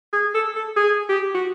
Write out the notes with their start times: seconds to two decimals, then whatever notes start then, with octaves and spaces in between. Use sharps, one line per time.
0.13 G#4
0.35 A4
0.56 A4
0.77 G#4
1.09 G4
1.35 F#4